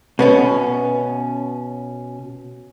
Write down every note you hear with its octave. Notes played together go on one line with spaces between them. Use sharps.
B2 B3 C#4